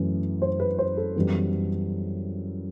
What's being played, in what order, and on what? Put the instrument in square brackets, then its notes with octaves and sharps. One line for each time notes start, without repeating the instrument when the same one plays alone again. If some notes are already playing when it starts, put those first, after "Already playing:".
Already playing: [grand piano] F#2 E3 A3
C5
B4
C5
A4
F#2 E3 G3 B3